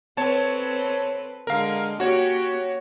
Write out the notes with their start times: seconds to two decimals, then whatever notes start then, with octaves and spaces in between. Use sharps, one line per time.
0.17 C4 A4 B4 C#5 A5
1.47 D3 G#3 A#4 F5
2.00 A#3 C#4 F#4 G4 C#5